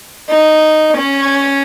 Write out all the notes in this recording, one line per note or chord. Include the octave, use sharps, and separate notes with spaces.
D#4
C#4